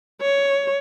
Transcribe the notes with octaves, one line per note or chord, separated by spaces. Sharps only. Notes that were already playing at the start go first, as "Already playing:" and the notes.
C#5